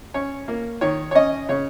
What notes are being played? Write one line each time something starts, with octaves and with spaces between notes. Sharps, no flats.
C#4 C#5
A#3
D#3 C#5
C#5
C#4 D#5
C#3 C#5